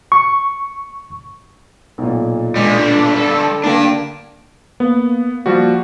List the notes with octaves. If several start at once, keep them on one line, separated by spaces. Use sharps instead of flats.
C#6
B1 A#2
D3 G3 G#3
D4
A4
D3 A#3 D4 G4
A#3 B3
F3 G3 F#4